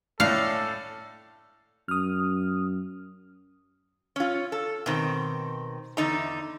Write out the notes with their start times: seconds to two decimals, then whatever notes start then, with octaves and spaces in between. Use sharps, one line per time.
0.20 A2 C#4 D4 A4 F5 F#6
1.88 F#2 D#6 F6
4.16 C#4 F4
4.52 A4
4.86 B2 D#3 C4
5.97 E2 D3 D#4 A#5